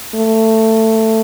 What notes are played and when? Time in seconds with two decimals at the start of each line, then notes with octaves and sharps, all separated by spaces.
0.15 A3